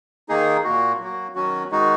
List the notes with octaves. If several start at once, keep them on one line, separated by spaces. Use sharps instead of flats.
D#3 A#3 D#4 G#4
A#2 A#3 F#4
F#3 A#3 F#4
D#3 F#3 C#4 F#4
D#3 G#3 D#4 F#4